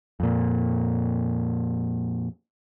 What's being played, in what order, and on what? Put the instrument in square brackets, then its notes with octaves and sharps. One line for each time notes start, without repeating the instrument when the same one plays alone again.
[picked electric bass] F2 A#2